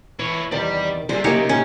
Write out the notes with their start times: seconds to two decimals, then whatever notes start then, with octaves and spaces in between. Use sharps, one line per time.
0.19 E3 E4 C#5
0.51 E2 C3 D#3 D5 G5
1.09 C3 G3 G#4 C5
1.24 C#3 F#3 A#3 D#4 G4 C#5
1.49 A2 A#3 C#4 G5